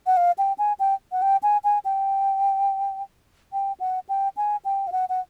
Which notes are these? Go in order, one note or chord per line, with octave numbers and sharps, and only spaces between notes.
F#5
F5
G5
G#5
G5
F#5
G5
G#5
G#5
G5
G5
F#5
G5
G#5
G5
F5
F#5
F#5